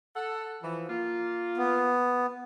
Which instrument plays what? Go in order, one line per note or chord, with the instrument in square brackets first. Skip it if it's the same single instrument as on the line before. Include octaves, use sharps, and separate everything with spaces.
[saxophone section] A4 F#5
E3 F3
A#3 F4
[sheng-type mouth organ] B3